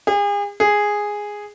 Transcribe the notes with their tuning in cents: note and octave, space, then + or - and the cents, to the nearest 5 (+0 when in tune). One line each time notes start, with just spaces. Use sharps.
G#4 -40
G#4 -5